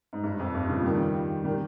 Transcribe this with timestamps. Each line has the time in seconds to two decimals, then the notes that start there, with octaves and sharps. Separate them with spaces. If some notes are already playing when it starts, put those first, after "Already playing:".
0.13 G#2
0.24 G2
0.39 F2
0.54 G2
0.70 C#3 F3
0.84 D#3 G3
1.44 D#3 G3